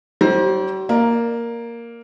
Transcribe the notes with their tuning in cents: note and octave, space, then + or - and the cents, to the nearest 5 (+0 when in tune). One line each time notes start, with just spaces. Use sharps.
G3 -45 C5 +20
A#3 +0 D5 +25